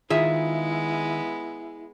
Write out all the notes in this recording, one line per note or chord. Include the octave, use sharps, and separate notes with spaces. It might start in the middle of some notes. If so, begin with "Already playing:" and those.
D#3 G#3 B3 E4 F4 G#4 E5